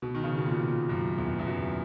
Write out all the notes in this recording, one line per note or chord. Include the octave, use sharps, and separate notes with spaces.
B2
D#3
C#3
B2
A#2
A#2
F#2
E2
E2
F#2